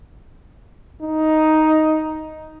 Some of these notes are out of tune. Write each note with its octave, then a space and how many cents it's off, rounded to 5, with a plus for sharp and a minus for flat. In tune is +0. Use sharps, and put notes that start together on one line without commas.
D#4 +5